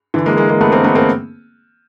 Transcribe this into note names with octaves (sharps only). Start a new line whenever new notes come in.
D3 E3
G#3 A#3
G#3 A#3
G#3 A#3
A3 B3
A#3 C4
A3 B3
A#3 C4